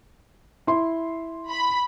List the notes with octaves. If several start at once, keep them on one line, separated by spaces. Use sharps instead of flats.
E4 C6
B5